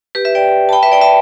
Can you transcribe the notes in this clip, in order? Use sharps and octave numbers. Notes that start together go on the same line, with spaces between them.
G4 B4
B4 E5
D5 G5
A5
G5 B5
B4 E5
D5 G5
E5 A5